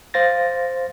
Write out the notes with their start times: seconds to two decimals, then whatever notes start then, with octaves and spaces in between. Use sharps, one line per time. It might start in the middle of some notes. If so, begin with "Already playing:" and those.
0.14 C5 F5 A6 A#6